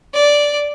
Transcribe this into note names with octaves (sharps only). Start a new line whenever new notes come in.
D5